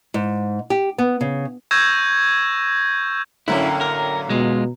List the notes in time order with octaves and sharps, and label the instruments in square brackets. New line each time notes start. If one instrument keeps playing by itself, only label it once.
[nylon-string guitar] G#2
G4
B3
C#3
[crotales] C#6 E6 G6 G#6 A#6 E7
[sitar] F#2 A2 A#3 [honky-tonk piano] D3 F#3 C#4 [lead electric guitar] E4
[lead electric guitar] A#4
[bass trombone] B2 [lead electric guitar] G#3 F4